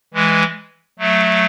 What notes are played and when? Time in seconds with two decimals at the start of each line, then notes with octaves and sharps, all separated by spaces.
0.14 E3 G#3
0.99 F#3 A3